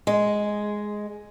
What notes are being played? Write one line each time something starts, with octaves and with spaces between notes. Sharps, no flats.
G#3